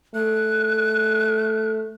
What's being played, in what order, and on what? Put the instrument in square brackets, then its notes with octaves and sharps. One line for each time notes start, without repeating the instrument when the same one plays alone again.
[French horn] A3 [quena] F#6